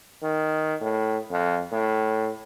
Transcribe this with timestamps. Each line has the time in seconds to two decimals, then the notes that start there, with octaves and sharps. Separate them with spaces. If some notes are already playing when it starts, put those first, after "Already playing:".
0.23 D#3
0.81 A2
1.31 F2
1.72 A2